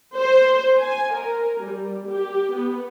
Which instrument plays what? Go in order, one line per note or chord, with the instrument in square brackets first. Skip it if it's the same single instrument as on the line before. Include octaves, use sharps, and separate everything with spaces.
[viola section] C5
G#5
A#4
G3
G4
B3